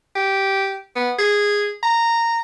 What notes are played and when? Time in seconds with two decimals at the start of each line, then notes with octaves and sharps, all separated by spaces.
0.15 G4
0.96 B3
1.19 G#4
1.83 A#5